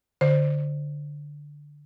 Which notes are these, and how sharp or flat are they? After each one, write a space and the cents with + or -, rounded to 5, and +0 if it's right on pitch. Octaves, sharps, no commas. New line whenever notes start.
D3 +0 C5 +0